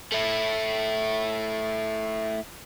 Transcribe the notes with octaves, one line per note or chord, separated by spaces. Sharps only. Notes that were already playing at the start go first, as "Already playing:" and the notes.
A3 E4